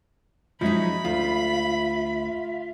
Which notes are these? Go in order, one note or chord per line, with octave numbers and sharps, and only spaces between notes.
F3 F#3 G#3 C#4 D#4 E5 B5
D2 F4